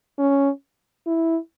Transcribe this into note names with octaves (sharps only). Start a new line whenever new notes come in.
C#4
E4